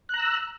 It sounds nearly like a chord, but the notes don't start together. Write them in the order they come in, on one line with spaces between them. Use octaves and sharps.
F#6 A#5 E6